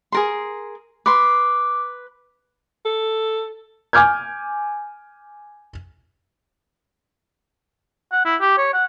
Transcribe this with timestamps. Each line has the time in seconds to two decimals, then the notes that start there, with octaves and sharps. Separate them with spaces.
0.12 G#4 A#4 C6
1.06 B4 C6 D6
2.85 A4
3.93 G#5 D6 F6 G6 G#6
8.12 F#5
8.25 E4
8.41 G4
8.58 C#5
8.74 F#5